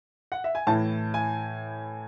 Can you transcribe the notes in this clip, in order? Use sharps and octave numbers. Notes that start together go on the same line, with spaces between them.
F#5
E5
G#5
A2 E3 A5
G#5